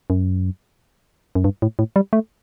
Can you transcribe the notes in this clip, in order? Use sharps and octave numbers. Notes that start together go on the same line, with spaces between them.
F#2
F#2
G2
A2
A2
G3
A3